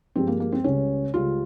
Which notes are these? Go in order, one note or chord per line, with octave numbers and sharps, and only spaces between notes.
G2 F3 G#3 C4
A#3
A#3
C4
C#2 C#3 G3 C#4
C#2 C#3 G3 F4